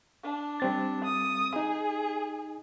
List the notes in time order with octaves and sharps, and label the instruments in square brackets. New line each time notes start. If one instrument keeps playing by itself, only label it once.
[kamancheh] D4
[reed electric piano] G3 C4 A6
[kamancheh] D#6
[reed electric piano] D#4 [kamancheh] G#4